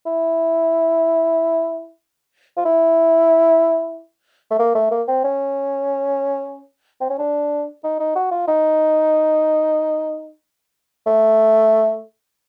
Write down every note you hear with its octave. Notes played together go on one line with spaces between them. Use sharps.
E4
F4
E4
A3
A#3
A3
A#3
C4
C#4
C4
C#4
D4
D#4
D#4
F#4
F4
D#4
A3